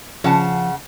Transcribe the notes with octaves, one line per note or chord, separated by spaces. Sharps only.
C#3 F3 F#5 A5